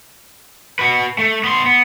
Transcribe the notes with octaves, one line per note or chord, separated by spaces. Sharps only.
F#4 B4
A3
B3 C6
B3